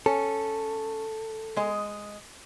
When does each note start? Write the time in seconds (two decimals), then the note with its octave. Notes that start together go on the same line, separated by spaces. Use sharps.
0.06 C#4 A4
1.56 G#3 D#5